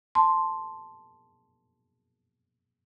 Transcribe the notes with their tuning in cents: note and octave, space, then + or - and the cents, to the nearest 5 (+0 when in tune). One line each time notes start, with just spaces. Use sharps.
A5 +0 C6 +0